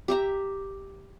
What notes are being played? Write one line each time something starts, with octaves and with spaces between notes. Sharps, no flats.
G4 E5 A#5